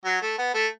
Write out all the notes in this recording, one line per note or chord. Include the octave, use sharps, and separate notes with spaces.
F#3
A3
B3
A3